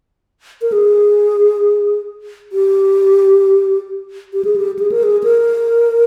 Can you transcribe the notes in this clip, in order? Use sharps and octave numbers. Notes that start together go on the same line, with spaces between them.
A#4
G#4
G4
G4
G#4
G4
G#4
A#4
G#4
A#4